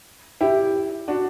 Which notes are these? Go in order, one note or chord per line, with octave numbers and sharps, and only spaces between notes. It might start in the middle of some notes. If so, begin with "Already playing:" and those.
E4 G4
D4 F#4